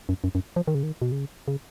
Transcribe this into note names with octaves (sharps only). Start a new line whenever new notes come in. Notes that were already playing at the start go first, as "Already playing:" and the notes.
F#2
F#2
F#2
F3
D#3
C#3
D#3
B2
C#3
C#3